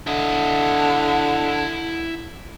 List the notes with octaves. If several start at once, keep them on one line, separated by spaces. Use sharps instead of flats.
D3 E4 D#5